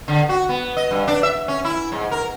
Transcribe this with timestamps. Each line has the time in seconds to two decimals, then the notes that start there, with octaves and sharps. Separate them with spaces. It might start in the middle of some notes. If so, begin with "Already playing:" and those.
0.08 D3
0.29 F#4
0.49 B3
0.77 D#5
0.91 G2
1.08 D4
1.23 E5
1.48 C#4
1.65 E4
1.92 G#2
2.11 A#4